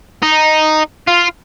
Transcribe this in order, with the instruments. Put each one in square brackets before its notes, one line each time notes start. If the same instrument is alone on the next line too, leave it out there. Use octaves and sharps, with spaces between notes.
[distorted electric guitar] D#4
F4